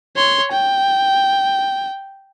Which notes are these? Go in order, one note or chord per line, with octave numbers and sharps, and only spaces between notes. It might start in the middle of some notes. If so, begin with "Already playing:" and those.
C#5 C6
G5